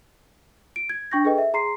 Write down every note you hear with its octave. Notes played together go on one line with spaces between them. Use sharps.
D7
G#6
D4 G5 C#6 G6 A#6
G#4 A4 B4 D#5 G5
E5
G#4 A#5 C6 C7